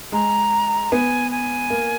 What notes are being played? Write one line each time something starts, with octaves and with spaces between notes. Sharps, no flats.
G#3 A#5
B3 G#5
G#5
A#3